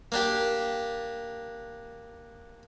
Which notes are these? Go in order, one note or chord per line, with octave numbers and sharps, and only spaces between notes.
A#3 D4 G4